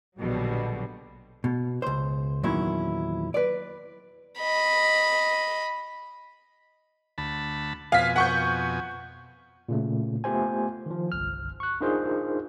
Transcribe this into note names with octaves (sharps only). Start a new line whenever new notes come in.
A#1 B2 D3 F#3 G3
B2
C#2 C5
E2 A#2 D#3 F#3 C#4 E4
B4 D5
D#5 B5
D2 A5 B5
F2 B2 F5 G#5 B6
F#5 C#6 G6
A#2 C#3 A3
A3 B3 F4 G4 C5 G#5
D#3 F3
G1 C2 F6
C#6 F#6
D4 D#4 F4 G#4 A#4 C5